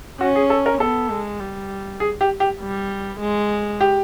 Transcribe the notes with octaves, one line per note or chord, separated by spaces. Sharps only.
C#4 F#4
G#4
A4
A#4
B3 A4
G#3
G3
G#4
G4
G4
G3
G#3
G4